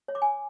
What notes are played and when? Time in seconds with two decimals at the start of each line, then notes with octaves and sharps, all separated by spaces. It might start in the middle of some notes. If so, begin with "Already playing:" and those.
0.08 C#5
0.15 D6
0.22 G#5